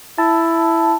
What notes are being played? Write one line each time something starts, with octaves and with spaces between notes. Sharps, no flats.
E4 A5